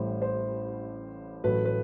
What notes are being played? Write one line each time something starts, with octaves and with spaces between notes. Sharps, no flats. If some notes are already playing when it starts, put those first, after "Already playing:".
Already playing: A1 A2 G3 C5
C5
A1 A2 F#3 A3 B4
B4